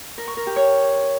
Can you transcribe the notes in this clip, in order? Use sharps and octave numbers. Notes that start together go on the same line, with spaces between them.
A#4
C#6
A#4
G4
C#5